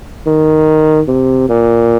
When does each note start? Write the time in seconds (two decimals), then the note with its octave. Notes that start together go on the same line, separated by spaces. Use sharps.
0.26 D#3
1.08 C3
1.49 A#2